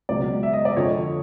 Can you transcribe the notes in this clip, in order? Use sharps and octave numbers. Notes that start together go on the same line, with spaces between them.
C#2 B2 F#3 D5
E5
D#5
D5
F2 D3 F3 C#5